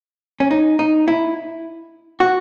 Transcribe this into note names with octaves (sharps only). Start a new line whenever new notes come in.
C#4
D#4
D#4
E4
F#4